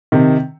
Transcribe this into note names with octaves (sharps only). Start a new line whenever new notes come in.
C3 D#3